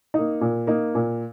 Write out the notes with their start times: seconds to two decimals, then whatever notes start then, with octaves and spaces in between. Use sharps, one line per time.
0.14 A#3 D#4
0.41 A#2
0.67 A#3 D#4
0.95 A#2